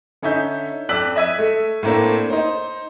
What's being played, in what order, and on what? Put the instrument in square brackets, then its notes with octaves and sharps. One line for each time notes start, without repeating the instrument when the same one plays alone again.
[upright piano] D3 C#4 D#4 C#5 E5 G6
F2 D5 E6 F#6 B6 F#7
D#5 E5 E6 G#6 B6 D#7
A3
A2 A3 A#3 C4 D4
D#4 C5